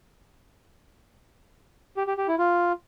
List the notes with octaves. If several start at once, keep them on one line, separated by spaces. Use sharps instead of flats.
G4
G4
G4
E4
F4